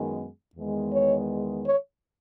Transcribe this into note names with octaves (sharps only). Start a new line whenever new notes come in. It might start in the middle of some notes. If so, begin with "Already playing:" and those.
Already playing: F#2 D#3 G#3 B3
E2 D#3 G#3 B3
C#5
C#5